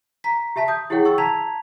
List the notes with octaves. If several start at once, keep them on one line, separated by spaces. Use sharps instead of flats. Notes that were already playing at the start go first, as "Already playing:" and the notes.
A#5 B6
G4 E5 A5 B6
D#6 G6
E4 G4 G#4 C#5 F#5 G5
C#6 E6 A6
A5 A#5 G#6 B6 F7